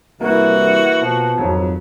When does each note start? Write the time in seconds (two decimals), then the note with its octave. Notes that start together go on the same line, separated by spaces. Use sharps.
0.21 C2 E3 A#3 F#4
1.02 B2 F3
1.38 G#1 F2 F#3